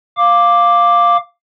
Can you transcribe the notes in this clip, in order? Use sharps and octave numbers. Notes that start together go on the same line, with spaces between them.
F5 D6